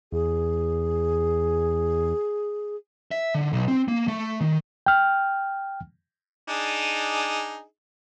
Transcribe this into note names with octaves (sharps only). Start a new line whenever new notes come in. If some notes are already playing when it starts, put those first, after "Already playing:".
E2 G#4
E5
D3
B1
C4
A#3
A3
D#3
G5 F6
D4 D#4 G#4